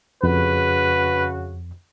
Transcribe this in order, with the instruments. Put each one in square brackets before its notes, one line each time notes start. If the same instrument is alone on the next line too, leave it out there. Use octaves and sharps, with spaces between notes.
[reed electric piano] F2 [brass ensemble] C#3 F#4 [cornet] B4